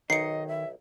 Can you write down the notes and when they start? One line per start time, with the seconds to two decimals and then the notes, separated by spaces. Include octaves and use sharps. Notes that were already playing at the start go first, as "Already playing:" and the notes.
0.10 B1 D#3 D#5 C7 C#7
0.48 E5